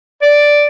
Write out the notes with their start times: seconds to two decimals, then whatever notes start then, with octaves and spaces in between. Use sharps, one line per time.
0.22 D5